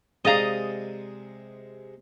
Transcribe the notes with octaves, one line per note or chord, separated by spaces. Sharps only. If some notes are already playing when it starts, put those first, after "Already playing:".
C3 G#3 G#4 D5 D#5 F5 A#5 D#6